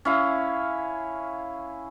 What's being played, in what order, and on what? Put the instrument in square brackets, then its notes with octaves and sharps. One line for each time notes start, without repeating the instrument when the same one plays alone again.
[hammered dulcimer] C#4 E4 F5